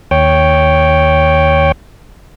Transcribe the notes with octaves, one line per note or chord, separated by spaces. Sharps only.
D#2 C#5 G5